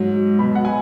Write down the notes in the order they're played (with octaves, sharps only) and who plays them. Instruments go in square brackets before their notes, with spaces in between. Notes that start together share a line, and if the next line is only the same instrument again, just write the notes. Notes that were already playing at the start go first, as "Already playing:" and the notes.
Already playing: [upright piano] G#2 F#3
B2 F#3 B5
F#5
G#5